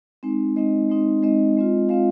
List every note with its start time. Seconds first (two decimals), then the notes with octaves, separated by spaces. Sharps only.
0.23 G#3 C4 D#4
0.56 G#3 C4 D#4 D#5
0.90 G#3 C4 D#4
1.22 G#3 C4 D#4 D#5
1.57 G#3 C4 F4
1.89 G#3 C4 F4 F5